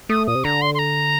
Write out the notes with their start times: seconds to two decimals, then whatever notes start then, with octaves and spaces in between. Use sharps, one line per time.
0.09 A3 D#6
0.27 A#2 D#6
0.35 C3
0.44 D3 A#5
0.62 C6
0.75 C6
0.79 A#5